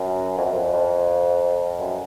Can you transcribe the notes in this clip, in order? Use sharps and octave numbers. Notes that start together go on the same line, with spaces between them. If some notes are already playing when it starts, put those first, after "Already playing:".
Already playing: F#2
F2
F#2
F2
F2
F#2